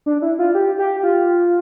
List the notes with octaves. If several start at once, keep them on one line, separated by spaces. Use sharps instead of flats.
D4
E4
F4
G4
G4
F4